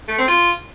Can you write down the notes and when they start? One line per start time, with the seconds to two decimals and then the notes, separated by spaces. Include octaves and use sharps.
0.08 A3
0.18 C4
0.28 F4